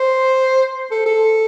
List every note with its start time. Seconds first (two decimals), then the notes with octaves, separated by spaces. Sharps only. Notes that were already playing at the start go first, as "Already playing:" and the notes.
Already playing: C5
0.91 A4
1.06 A4